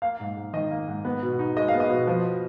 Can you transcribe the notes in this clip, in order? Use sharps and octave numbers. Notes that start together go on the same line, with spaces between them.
A#3 F5
G#2
G#2
D#3 D#5
A#3
G#2
B3
B2
D#4
G#3 D#5
F5
B3
D#5
B2
F3